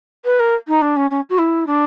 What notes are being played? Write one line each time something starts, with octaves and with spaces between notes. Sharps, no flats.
B4
A#4
D#4
D4
C#4
C#4
F#4
E4
D4